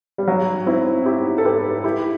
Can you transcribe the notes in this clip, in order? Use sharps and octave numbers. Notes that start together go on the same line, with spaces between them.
G3
F#3
C4 E4
E4 G4
A4
G4 B4
E4 G4